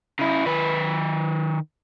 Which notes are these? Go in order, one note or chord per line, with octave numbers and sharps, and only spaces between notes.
C#3 E4
D#3 B4